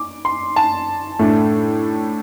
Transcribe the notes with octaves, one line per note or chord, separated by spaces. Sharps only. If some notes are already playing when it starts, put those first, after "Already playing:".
Already playing: D6
C6
A5
A2 A3 D4